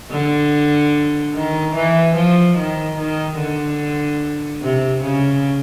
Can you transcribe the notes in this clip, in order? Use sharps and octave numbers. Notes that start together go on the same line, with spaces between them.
D3
D#3
E3
F3
D#3
D#3
D3
C3
C#3